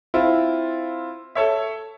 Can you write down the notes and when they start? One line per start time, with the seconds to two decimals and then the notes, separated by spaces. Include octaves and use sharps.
0.14 C4 E4 F4
1.35 A4 C#5 E5